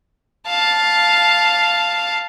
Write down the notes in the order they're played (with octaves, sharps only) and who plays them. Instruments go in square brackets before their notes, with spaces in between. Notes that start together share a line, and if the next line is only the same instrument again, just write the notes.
[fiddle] F5 A5